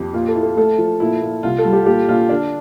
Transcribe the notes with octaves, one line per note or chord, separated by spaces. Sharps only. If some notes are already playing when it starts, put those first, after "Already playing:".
Already playing: F2 G4
A#2 F4
A4
E4
A4
A3 A4
F3
A#2 E4
A#2
C2 F4
A4
G3
G4
A#2 G4
A#1 F4
D3 D4